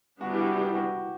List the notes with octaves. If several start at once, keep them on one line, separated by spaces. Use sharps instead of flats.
E3 G3 B3 D4 F#4
G4
F#4
G4
F#4